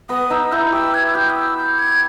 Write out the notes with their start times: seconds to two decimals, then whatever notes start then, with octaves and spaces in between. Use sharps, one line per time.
0.09 B3 D#6
0.30 D#4 E6
0.52 E4 G6
0.72 G4 E6
0.94 G#6
1.06 E6
1.14 G4 G6
1.30 D#6
1.36 E6
1.57 G6
1.78 G#6